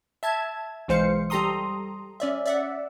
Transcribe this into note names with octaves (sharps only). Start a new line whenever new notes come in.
E5 A5 G#6
B1 E3 G#3 C5 F5 C#7
G3 G4 A4 A#5 C6 D#6
C#4 D5 E5
D5 E5 F#5